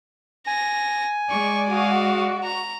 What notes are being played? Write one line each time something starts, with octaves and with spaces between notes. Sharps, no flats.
G#5 A#6
G#3 D5 C#6
F#4 F5 D#6
A#5